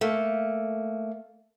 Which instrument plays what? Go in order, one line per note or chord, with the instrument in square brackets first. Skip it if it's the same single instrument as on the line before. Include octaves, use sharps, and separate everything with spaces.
[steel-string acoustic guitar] A3 A#3